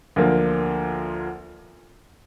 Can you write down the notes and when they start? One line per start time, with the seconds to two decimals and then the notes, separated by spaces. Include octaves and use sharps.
0.16 D2 D3 F3 A#3